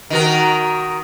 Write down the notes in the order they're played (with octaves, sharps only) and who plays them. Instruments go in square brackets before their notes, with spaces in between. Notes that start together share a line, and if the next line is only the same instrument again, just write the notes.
[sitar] D#3 F#4 A#4